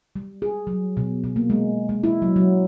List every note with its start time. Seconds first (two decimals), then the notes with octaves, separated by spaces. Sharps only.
0.16 G3
0.42 G#4
0.67 F#3
0.97 B2
1.24 B2
1.36 A#3
1.50 G#3
1.89 G#3
2.04 E4
2.22 F#3
2.36 F#3